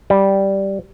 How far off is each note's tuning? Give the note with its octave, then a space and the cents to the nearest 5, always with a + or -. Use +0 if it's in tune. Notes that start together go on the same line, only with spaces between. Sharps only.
G3 -5